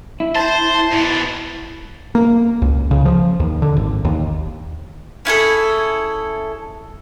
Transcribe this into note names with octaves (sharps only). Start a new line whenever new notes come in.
E4
C5 A5
A5
G#2 B2
A#3
C#2
C#3
F3
D#2
D3
G#1
D#2
C#4 E4 G#4 A4